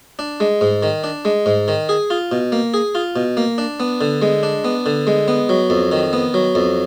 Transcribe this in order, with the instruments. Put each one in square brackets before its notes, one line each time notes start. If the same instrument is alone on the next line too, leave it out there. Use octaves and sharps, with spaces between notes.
[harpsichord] D4
G#3
G#2
D#3
D4
G#3
G#2
D#3
G#4
F4
B2
A#3
G#4
F4
B2
A#3
D4
B3
D3
G#3
D4
B3
D3
G#3
B3
F#3
F2
D#3
B3
F#3
F2